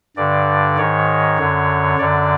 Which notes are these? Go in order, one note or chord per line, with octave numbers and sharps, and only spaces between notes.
G2 D3 D5
G#2 D#3 C#5
F#2 D3
F#2 D3 D5